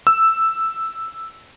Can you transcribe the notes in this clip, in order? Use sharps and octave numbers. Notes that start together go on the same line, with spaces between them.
E6